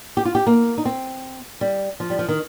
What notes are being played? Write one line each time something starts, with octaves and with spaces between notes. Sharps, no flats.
G4
F4
G4
A#3
D#4
C4
G3
F3
G3
F3
D#3